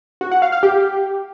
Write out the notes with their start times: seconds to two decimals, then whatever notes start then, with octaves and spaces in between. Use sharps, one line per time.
0.21 F#4
0.31 F#5
0.42 F5
0.52 F5
0.63 G4